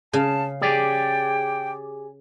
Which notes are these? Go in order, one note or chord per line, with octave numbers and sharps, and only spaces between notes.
C#3 F5 A5
G4 G#4 D5 G5